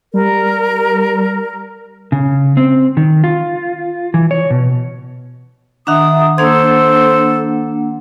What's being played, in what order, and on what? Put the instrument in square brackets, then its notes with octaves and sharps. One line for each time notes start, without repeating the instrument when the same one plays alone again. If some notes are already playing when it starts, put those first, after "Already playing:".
[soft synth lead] G3 [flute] A#4
[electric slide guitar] C#3
C4
D#3
F4
E3
C#5
B2
[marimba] D#3 D4 [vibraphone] E5 F#5 A#5 [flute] D#6
[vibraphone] A#3 D4 F#5 [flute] A4 [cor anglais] C5 [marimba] G#6